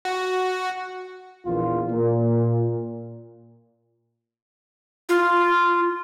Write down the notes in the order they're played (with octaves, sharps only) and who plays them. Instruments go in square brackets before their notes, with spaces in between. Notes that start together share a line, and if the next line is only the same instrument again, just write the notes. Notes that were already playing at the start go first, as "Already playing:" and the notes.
[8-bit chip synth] F#4
[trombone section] A#1 E2 A#2 F4
A#2
[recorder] F4